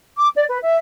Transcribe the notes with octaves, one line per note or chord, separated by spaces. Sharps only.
D6
D5
B4
E5